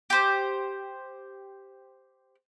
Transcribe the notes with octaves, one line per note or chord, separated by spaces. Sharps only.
G4 C5